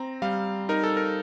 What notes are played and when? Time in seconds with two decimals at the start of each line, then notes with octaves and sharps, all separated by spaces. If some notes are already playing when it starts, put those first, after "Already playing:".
Already playing: C4 A#5
0.22 G3 F5
0.69 D#4 A#4
0.84 A4
0.97 A#4